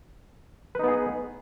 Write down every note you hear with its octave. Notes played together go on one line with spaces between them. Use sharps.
B3 D#4 G#4 B4